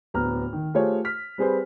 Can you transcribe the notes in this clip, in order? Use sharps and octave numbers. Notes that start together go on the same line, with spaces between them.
D1 B3 A#5 F6
D#3
A3 F4 G4 G#4 C5 C#5
F6 B6
G3 C4 G#4 B4 C5